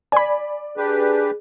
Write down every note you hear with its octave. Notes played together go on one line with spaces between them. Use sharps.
D5 G#5 B5
D4 G4 G#4 B4